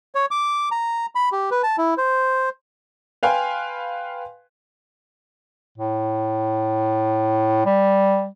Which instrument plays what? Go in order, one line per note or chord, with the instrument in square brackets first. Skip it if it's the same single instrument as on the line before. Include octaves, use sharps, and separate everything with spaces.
[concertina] C#5
D6
A#5
B5
G4
B4
A5
E4
C5
[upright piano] B4 F5 G5 G#5 C6
[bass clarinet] A2
G3